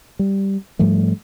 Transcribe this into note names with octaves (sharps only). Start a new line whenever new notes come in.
G3
G#2 F3 G3 A3